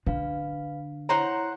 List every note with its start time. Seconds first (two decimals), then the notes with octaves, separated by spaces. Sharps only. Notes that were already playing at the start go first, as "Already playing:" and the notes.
0.07 D3 B4 F5
1.09 E4 C5 C#5 F#5 A#5